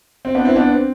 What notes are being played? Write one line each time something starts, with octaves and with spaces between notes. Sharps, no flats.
C4
B3 D4
C4 E4
B3 D4
C4